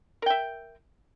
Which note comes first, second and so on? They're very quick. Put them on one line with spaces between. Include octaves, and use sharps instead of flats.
A#4 G5 E5